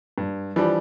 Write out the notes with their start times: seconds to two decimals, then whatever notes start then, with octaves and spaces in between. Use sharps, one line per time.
0.18 G2
0.56 E3 F3 G3 D4